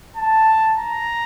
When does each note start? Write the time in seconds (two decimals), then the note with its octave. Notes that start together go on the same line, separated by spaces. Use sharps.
0.17 A5
0.77 A#5